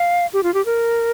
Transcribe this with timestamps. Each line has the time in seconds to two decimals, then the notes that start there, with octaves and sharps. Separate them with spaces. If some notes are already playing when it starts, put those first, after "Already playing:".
Already playing: F5
0.33 G4
0.43 F4
0.54 G4
0.66 A#4